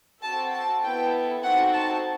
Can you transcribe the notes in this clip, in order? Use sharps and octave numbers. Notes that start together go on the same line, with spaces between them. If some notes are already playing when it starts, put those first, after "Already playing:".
C4 F#4 A4 A5
A5
B3 E4 A4 G5
C4 D#4 F#4 A4 F#5
A5